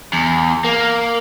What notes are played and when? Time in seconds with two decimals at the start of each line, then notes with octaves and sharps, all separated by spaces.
0.13 E2
0.65 A#3